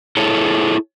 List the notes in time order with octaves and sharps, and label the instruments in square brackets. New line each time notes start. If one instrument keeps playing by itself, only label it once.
[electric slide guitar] E4 G#4 A4 C#5